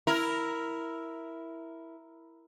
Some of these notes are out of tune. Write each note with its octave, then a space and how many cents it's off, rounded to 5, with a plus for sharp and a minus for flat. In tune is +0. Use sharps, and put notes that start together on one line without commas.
E4 +0 A#4 +0